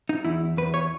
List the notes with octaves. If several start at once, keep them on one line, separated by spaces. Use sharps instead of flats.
D#4
E2 E4
E2 B4
C#5